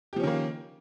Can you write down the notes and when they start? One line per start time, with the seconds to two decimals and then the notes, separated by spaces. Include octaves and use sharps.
0.13 G4
0.16 F3
0.20 C#4
0.23 D#3
0.27 A#3